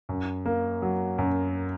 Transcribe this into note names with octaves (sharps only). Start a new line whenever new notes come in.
F#2
A#3
F#3
F#2